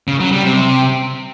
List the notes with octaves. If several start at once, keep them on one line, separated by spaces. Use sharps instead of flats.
C#3
F#3
G3
C3